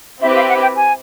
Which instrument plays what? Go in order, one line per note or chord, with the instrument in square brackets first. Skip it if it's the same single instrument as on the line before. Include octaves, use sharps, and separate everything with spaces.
[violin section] C4 E4 G4 B4 [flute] E5
[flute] F5
F#5
G5
G#5